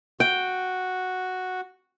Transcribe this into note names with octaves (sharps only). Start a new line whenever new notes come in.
F#4 G5